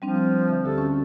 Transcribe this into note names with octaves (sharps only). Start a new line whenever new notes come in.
F3 G3 C4 D4
D3 E5
D2 D3 G4 A4
C#4 F#4